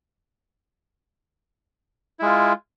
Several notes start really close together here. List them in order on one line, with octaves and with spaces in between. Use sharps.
E4 G#3 F4